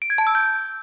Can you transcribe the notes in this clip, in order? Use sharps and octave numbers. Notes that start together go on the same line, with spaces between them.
D7
G#6
A5
E6
G6